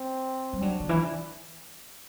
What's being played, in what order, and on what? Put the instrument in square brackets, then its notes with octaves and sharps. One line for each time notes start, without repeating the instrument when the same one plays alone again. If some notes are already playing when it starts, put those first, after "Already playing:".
Already playing: [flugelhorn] C4
[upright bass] G3
[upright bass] F#3 [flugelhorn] D4
[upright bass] D3
E3